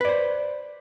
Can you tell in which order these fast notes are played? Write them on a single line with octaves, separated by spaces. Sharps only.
B4 D5 C5